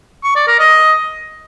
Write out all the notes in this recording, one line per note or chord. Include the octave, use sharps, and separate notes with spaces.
C#6
D5
A#4
D#5